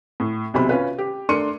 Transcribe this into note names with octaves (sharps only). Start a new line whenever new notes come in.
A2
B1 C3 C4 B5
C#4 F4 B4
G4
A3 D4 A#4 C6 C#7 D#7